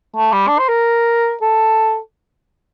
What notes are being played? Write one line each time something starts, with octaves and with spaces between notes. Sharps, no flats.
A3
G3
D4
C5
A#4
A4